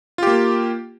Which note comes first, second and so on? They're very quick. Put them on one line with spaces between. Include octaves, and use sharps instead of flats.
F4 G4 A#3